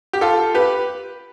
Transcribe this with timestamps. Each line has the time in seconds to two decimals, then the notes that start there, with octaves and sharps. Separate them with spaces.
0.13 G4
0.21 F4 A4
0.55 G4 B4